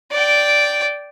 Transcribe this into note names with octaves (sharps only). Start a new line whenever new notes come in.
D5 G5